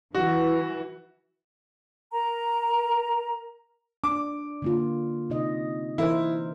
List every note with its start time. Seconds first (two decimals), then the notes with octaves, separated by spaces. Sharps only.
0.15 E3 F#4
2.12 A#4 A#5
4.04 D4 D6
4.62 D3 A#3 F4
5.30 C3 D#4 D#5
5.98 E3 E4 A#4 C5